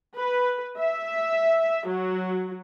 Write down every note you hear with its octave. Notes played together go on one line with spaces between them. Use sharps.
B4
E5
F#3